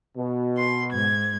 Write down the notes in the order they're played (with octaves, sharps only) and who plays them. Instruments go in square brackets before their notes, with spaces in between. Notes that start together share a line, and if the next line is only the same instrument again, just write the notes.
[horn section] B2
[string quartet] C6
G#2 G#6